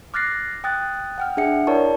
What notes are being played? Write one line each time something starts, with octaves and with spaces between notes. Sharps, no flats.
D6 F6 F#6 A6 A#6 C7
G5 D#6 F#6 A6
F#5 G5 F6
D4 G#4 E5 F#5 C#7
E4 A#4 C#5 D5 A5 C#6